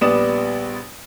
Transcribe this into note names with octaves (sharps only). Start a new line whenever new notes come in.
A#1 G3 B3 D5 D#6 E7